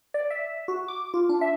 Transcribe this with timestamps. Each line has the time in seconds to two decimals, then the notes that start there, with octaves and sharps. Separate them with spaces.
0.14 D5
0.30 E5
0.68 F#4
0.88 D6
1.14 F4
1.29 D4
1.41 E5